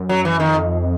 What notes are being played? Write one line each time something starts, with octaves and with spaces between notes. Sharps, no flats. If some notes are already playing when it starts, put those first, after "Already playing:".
Already playing: F#2
F#3
E3
F2 D#3